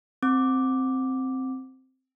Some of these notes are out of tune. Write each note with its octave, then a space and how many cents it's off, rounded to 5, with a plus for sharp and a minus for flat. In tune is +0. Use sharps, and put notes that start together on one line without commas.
C4 +0 D6 +0